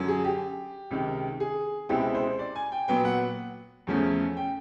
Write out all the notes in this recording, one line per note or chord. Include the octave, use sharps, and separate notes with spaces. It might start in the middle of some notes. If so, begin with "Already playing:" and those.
Already playing: F#2 D3 F#3
G#4
G4
C#2 C3 D#3
G#4
C#2 B2 G#3 C4 E4 G4
C5
D5
G#5
G5
A#2 F#3 B3 G5
F#5
E2 C#3 F3 A3 C#4
G5